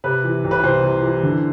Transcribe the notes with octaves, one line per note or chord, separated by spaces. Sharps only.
C3 B4
E3
C2
B4
C2 C5
C3
E3
D3